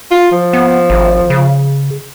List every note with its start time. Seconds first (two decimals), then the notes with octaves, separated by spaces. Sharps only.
0.11 F4
0.31 F3
0.53 B3
0.90 G#1
1.30 C#3